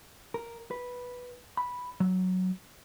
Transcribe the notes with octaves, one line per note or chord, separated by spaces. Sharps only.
A#4
B4
B5
F#3